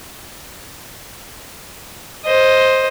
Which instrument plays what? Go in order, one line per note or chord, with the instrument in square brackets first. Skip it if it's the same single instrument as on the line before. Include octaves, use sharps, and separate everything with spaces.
[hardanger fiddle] C5 D#5